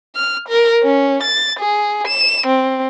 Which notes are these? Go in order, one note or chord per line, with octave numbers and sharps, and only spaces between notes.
F6
A#4
C#4
A6
G#4
E7
C4